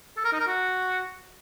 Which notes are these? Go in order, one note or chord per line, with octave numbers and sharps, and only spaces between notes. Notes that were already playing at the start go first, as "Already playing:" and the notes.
A4
A#4
D#4
A#4
F#4